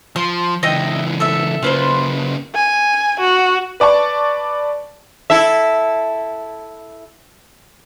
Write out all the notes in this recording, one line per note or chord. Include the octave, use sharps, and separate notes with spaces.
F3 C6
C#2 E3 D#5 E5 G5
A4 E5
C#3 A#3 F4 B4 C5
G#5
F#4
B4 D5 A5 C#6
E4 A4 E5